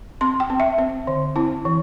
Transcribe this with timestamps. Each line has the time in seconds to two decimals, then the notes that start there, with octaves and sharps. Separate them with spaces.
0.21 C4 C6
0.40 G5
0.50 C4
0.60 E5
0.78 C4
1.07 D3
1.36 C4 E4
1.65 E3